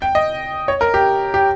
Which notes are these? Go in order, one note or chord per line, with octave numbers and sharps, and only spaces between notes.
G5
D#5
C#5
A#4
G4
G4